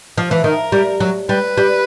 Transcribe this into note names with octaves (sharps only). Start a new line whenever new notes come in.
F3
E3
D#3 A#4
G3
F#3
G3 B4
G3